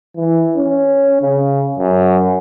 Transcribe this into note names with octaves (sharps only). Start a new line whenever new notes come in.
E3
C#4
C#3
F#2